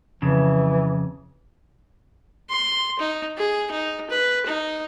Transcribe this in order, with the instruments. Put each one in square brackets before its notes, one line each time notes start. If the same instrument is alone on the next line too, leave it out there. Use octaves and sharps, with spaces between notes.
[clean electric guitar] F2 C#3 [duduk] E3
[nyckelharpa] C6
D#4
G#4
D#4
B4
D#4